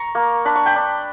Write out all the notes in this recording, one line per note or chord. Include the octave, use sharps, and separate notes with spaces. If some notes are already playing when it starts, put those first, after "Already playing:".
Already playing: A#5 C#6
A#3
D4 B5
C#6
G5 B5
D4